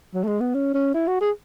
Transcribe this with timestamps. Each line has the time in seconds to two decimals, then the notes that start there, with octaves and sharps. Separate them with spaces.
0.14 F#3
0.24 A3
0.27 G#3
0.40 B3
0.54 C#4
0.74 C#4
0.94 E4
1.07 F#4
1.21 G#4